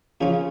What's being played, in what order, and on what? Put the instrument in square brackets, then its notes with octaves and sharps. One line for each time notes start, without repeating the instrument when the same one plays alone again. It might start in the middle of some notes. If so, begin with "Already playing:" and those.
[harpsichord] A#2 F3 C#4 F4 [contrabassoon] C#3